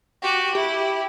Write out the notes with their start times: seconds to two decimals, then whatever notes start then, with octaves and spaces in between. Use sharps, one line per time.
0.23 F#4 G4
0.55 E4 G4